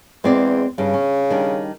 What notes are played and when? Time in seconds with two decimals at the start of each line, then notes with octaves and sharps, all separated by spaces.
0.24 E2 G#3 C4 D5
0.78 G2 C#3
0.94 C#4
1.30 D#3 G3 D4